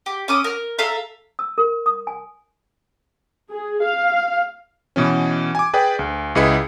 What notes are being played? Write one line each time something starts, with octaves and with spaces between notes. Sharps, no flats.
G4
C#4 D6 D#6
A#4 F6
A4 E5 F5 A#5
E6
A#4
D#6
G#5
G#4
F5
B2 E3 C#4
G#5 D6
G#4 B4 D5 G5
D2
C#2 E4 G#4 B4 D#5 C#7